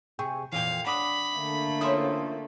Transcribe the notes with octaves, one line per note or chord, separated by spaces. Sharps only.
C3 G#4 G5 C#6
F2 A#2 E3 G4 F5
D4 F#5 B5 D6 D#6
D3 A3 A#3
F3 C#4 E4 C6 D#6